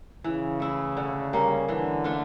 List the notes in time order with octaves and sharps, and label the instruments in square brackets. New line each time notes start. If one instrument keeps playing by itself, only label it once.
[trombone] C#3 [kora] E3
[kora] A3 E4
D3
G3 A#3 C#4
[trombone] D3 [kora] E3
[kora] A3 D4 F4